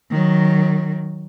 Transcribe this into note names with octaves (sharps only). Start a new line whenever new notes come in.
D#3 F#3